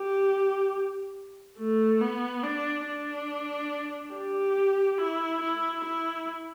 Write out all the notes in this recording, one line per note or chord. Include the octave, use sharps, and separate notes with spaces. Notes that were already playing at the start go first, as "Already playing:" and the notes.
Already playing: G4
A3
B3
D4
D4
G4
E4
E4
E4